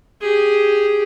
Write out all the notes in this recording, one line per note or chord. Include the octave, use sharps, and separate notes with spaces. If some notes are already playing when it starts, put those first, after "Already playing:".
G4 G#4